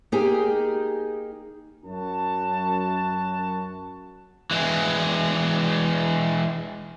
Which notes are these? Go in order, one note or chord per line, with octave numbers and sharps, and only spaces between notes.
A#3 D#4 G4 G#4
F#2 F#4 A5
E3 G#3